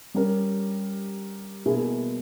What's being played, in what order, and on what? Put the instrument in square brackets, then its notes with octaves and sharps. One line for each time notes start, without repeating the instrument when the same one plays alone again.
[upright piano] G3 C#4 G4 A#4
B2 A#3 E4 G#4